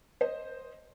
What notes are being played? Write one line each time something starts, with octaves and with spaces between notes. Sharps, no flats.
C5 D#5